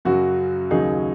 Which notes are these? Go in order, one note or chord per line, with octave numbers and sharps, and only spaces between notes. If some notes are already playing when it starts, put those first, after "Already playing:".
F#2 C#3 F#3 F#4
D#2 C#3 F#3 D#4 G#4